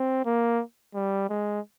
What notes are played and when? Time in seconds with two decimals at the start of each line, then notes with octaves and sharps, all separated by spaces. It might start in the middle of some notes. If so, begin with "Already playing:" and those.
Already playing: C4
0.26 A#3
0.95 G3
1.29 G#3